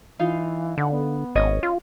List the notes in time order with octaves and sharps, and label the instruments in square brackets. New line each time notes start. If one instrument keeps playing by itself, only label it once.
[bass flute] E3 [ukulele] D#4 F4 F5
[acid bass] D3 [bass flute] F#5
[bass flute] B3
[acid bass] G#1 [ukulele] C#4 C#5 D#5
[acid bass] F4